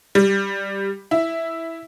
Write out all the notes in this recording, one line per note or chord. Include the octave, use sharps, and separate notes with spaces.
G3
E4